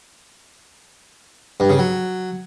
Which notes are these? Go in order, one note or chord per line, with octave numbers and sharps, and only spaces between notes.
G2
C#3
F#3